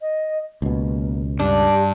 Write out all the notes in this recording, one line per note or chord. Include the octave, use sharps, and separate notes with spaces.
D#5
C#2 B2 A#3
G2 D4 G4